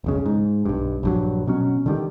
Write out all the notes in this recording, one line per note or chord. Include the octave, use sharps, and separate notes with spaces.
E1 B1 C#3
G#2
B1 G2
A#1 G2 F#3
B2 F#3 C#4
D3 D#3 G3